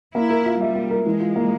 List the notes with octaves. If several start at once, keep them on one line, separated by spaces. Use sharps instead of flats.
A#3 E4
A#4
F4
G3 E5
A#3
A#4
E3 G#3
F4
A#3